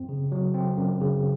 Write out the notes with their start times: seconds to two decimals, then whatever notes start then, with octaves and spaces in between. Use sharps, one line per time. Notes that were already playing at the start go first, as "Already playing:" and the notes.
Already playing: F#2 C4
0.09 C#3
0.32 F#3
0.54 C4
0.77 F#2
1.01 C#3